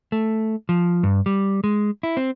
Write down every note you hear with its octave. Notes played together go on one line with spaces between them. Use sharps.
A3
F3
G2
G3
G#3
E4
C4